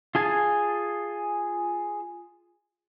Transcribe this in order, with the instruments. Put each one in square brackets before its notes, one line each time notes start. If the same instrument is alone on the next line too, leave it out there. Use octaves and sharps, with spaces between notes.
[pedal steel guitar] F4 G#4 G#5 A5